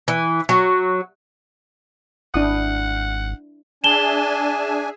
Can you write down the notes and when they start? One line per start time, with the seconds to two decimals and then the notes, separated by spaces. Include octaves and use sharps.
0.08 E3
0.49 F#3
2.34 G#1 D4 E4 F#5 D#6
3.84 D4 G#4 E5 G#5 A5 E7 G7